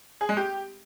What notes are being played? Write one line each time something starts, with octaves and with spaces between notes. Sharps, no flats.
G#4
G#3
G4